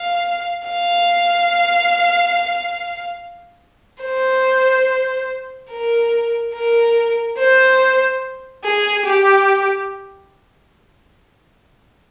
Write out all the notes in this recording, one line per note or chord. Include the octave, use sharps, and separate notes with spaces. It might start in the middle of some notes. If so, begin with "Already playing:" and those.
Already playing: F5
F5
C5
A#4
A#4
C5
G#4
G4